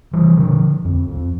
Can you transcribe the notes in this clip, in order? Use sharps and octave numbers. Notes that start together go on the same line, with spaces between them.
E3 G3
D3 F3
F2
F2